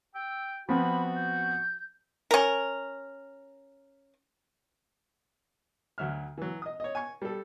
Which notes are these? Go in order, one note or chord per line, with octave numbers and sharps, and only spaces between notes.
G5 E6
F3 B3 C4 F#4 B5
G6
C#4 A#4
D2 F#3 E5 F6
E3 F#3
D#5 D#6
C#5 D#5
G#5 C#6
G3 A4